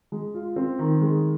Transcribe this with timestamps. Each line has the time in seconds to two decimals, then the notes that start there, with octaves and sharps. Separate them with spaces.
0.12 G#3
0.34 F4
0.56 C4
0.79 D#3
1.01 G#3